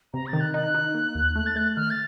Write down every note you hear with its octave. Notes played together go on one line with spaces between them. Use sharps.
C3 A#5
A6
D#3
F#6
D#4 F#6
D#4
A#3
D#2
A3 F#6
A6
A3 F#6
D#3 F6
A6